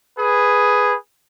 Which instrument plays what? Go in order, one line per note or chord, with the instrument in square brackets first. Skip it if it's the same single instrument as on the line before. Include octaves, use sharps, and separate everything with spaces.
[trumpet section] G#4 B4